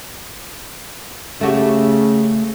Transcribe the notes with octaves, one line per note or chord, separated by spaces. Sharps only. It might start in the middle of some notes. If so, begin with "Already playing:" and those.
C#3 A3 F#4 G4